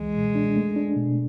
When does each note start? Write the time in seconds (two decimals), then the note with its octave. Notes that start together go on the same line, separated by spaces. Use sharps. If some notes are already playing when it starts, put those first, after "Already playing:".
Already playing: C#2 E3 G#3
0.15 B2
0.35 D4
0.56 A3
0.76 D4
0.97 B2